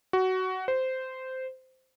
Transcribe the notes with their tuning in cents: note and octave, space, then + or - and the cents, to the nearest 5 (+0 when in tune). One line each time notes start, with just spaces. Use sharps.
F#4 +15
C5 -10